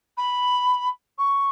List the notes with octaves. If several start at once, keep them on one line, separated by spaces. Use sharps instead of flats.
B5
C#6